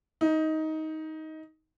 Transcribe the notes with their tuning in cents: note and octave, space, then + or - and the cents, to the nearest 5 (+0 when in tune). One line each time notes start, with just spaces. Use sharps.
D#4 +15